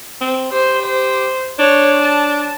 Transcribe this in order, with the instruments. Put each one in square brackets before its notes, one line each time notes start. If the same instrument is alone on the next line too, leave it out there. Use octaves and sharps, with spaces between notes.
[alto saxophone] C4
[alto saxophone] G4 [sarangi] C5
[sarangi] C5
[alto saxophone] D4 [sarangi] C#5
[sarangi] A5